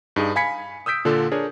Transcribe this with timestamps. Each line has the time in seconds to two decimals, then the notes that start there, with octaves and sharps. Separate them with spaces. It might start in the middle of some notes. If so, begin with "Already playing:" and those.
0.16 G2 D#4 G#4
0.36 F5 G#5 B5 G#6 B6 C#7
0.86 D#6 E6 G6 B6 D7
1.05 A#2 D3 D4 F4 A4
1.32 D4 G#4 A#4 C#5